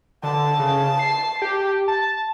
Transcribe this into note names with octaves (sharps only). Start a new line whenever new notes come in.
D3 A5
C#3
C7
G4
A5